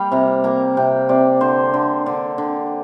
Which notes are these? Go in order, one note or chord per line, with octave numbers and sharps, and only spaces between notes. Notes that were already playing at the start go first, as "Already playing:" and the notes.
Already playing: G3 A#3 F5 G5
C3 A#5
A#3 A#5
C3 G5
C3 D5
D3 C5
D3
D3
D3